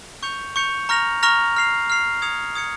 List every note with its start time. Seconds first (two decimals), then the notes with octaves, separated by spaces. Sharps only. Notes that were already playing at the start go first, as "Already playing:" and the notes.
0.23 C#6 G6 C#7 F7
0.56 C#6 G6 C#7 F7
0.89 A#5 C#6 F6 A#6 F7
1.23 A#5 C#6 F6 A#6 F7
1.56 F6 C7 F7
1.90 F6 C7 F7
2.22 D#6 G#6 C#7 F7
2.55 D#6 G#6 C#7 F7